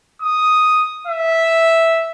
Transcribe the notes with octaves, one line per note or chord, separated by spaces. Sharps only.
D#6
E5